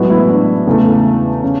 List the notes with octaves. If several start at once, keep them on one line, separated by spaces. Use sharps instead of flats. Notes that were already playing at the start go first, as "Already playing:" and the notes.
Already playing: A2 F#3 G#3 B3 F#4
E3 E4
D4
E2 C#3 E3 A3
C#3 C#4